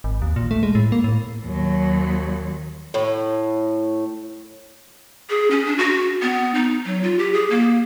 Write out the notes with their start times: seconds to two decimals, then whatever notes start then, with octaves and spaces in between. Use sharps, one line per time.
0.04 G#1
0.22 D#2
0.36 A#2
0.51 A3
0.63 G#3
0.75 A2
0.92 A#3
1.04 A2
1.45 D#2 F#3
2.94 A2
5.30 G#4
5.51 C#4
5.65 D4
5.78 F#4
6.22 B3
6.54 D#4
6.85 F#3
7.03 F4
7.19 G4
7.33 G#4
7.50 A#3